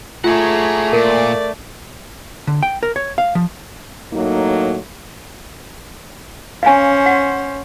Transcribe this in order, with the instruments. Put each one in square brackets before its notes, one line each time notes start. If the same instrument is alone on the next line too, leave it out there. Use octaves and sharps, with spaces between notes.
[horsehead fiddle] A3 [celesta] F4 [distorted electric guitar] G#4 F#5 [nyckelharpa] C#5 A#5
[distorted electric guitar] A#2 [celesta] A#4 [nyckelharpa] D5
[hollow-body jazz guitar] D3
G5
A#4
C#5
F5
F3
[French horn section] A2 F#3 A#3 D#4
[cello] C#4 C5 [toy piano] F5 G#5
[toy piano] F#5